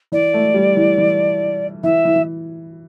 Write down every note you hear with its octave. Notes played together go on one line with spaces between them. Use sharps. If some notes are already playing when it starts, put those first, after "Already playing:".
E3 D5
A3
G3
E3
E3
E3 E5
E3
E3